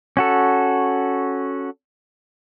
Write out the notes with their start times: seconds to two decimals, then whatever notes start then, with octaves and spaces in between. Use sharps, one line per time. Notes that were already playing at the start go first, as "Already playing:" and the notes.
0.17 C#4 F#4 A4